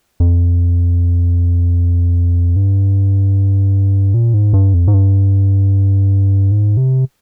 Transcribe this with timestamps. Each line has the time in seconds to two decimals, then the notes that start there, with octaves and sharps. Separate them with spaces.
0.20 F2
2.56 G2
4.14 A#2
4.34 G#2
4.53 G2
4.74 F2
4.88 G#2
4.94 G2
6.51 G#2
6.77 C3